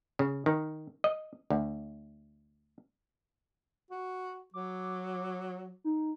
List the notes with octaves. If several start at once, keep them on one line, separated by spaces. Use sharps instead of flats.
C#3
D#3
D#5
D2
F#4
F#3 D6
D#4